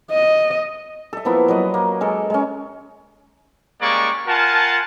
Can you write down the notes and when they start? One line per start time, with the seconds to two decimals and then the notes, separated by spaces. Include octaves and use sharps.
0.11 D#5
1.13 A4 E5
1.25 F3 A#3 B3 E4
1.48 F#3 A#4 B4 D#5
1.74 A#3
2.01 G#3 A4 A#4
2.30 G#3 C#4
3.81 G3 G#3 A#3 C#4 D5 C#6
4.27 F4 A#4 F#5 G#5 A5